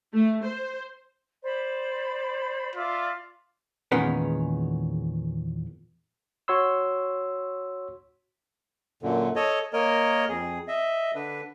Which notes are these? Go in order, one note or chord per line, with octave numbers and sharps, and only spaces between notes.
A3
C5
C5 D5 B5
F4 D5 E5 D6
E2 A#2 D#3 G#3 B3 C#4
F#4 C#5 C6 E6
F#2 A#2 D3
A4 C#5 D#5
A#3 A#4 C#5 D#5
F2 G#4
D#5 E5
D3 D4 B4